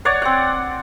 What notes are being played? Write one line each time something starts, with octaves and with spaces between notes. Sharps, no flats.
C#5 D5 F#5
C4 F#5